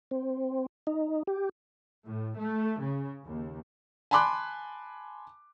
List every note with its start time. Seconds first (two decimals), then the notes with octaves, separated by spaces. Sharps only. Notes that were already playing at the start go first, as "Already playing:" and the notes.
0.11 C4
0.87 D#4
1.27 G4
2.06 A2
2.38 A3
2.78 C#3
3.25 D#2
4.11 G#5 A5 B5 C6 D6 F#6